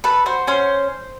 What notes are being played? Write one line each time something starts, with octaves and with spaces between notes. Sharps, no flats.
A4 B4
F#4 C5
C#4 C5